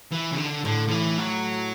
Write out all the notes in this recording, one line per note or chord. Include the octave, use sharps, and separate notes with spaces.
E3
C#3
D3
A2 D3
D3
E3
F#3